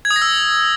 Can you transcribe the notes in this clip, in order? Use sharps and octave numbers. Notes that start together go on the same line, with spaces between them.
G#6
D#6
A#6
E6